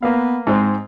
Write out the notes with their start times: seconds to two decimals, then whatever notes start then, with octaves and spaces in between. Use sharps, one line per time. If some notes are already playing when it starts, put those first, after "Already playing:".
0.02 A#3 B3 B4 F5
0.47 G#2 G#3 C4